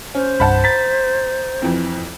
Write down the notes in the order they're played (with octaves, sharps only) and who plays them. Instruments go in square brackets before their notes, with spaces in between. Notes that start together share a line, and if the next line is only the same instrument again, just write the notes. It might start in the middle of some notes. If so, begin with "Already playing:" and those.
[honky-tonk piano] C#4 [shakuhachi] C5
[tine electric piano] C2 G2 [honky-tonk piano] F#5 A5 B5
[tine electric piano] A#5 A6 [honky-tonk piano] B6
[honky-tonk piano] F2 E3 C4